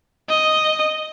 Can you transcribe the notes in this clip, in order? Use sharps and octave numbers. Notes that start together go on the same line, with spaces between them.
D#5